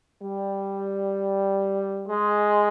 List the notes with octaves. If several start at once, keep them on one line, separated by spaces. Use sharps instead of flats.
G3
G#3